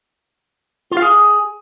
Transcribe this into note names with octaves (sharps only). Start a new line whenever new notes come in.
F4
F5
G#4